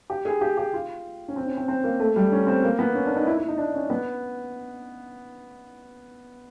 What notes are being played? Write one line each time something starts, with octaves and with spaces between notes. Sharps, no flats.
G4
G#4
G4
G4
F4
C#4
C4
C#4
C4
C4
A#3
A3
G3
C#4
C4
A#3
B3
C#4
D4
D#4
E4
E4
D#4
D4
C#4
B3